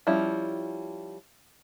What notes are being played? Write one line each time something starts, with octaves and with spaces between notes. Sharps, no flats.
F3 G3 C#4 E4